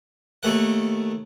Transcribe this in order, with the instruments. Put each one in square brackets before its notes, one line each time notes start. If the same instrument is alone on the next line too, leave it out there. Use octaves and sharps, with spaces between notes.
[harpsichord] D#2 A3 F#5